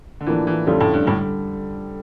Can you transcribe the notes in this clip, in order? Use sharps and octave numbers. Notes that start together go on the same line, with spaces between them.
D3
A2 E3 F3 A#3 D4
E3
F2 D3 G3 A3 C#4 F4
A2
G2
A2 D3 G3